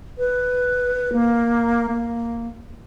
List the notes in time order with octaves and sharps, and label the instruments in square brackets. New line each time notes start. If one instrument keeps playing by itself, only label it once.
[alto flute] B4
A#3
A#3